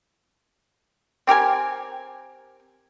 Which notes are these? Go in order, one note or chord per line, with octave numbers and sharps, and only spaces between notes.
C4 G4 A#4 G#5